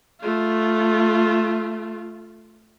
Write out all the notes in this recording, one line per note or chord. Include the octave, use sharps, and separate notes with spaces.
A3 F4